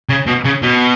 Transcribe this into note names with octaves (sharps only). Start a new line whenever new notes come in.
C#3
B2
C#3
B2